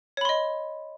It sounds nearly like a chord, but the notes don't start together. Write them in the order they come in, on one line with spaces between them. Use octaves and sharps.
C#5 B5 C6 D#5